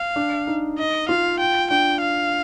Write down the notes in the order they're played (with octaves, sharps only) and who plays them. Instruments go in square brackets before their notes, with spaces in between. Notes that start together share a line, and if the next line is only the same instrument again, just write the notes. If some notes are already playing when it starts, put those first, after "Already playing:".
Already playing: [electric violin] F5
[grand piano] D4
D#4
[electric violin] D#5
[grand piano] F4 [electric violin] F5
[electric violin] G5
[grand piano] D4 [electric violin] G5
[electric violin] F5